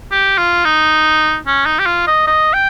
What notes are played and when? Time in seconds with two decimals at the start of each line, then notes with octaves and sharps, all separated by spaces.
0.11 G4
0.38 F4
0.65 D#4
1.47 C#4
1.66 D#4
1.79 G4
1.86 F4
2.07 D#5
2.27 D#5
2.53 G5